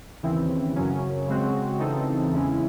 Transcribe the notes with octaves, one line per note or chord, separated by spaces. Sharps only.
D#2 C#3 E3 C4 E4
F#2 C#3 F#3 C#4
C#3 G#3 C4 F#4
C#3 E3 C4 D#4 A4
E2 C#3 G#3 C#4 E4